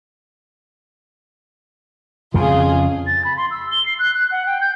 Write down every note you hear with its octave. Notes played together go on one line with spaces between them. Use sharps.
F2 C#3 F4 G#4
A6
B5
C6
E6
G7
C7
F#6
F#6
F#5
G5
G6